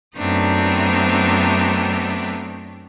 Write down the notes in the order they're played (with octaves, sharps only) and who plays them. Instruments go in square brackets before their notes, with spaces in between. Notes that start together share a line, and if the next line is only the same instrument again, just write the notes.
[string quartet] F#2 A3 B3 C4 D4 D#4